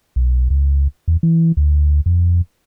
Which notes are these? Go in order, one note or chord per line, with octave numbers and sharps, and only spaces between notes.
B1
C#2
E2
E3
D2
F2